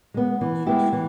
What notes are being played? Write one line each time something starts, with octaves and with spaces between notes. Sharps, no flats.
G#3 B3
E3
G#3 B3 E4 G4
E3